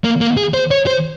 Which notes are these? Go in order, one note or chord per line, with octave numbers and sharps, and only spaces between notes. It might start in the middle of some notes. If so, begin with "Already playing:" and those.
A#3
A#3
G#4
C5
C#5
C5